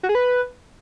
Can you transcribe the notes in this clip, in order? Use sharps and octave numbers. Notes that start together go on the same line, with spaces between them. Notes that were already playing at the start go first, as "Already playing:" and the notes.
F#4
G#4
B4